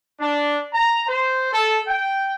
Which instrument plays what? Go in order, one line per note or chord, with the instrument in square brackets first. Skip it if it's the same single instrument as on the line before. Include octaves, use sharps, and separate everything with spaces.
[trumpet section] D4
A#5
C5
A4
G5